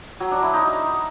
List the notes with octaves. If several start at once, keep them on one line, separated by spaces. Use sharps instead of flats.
F#3
D4
E4
D#4